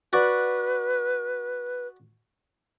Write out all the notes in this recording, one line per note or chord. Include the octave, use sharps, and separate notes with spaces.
F#4 B4 D5